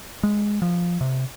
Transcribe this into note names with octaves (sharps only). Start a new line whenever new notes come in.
G#3
F3
C3